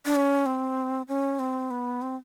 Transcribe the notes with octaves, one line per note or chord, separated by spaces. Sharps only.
D4
C#4
C4
C#4
C4
B3
C4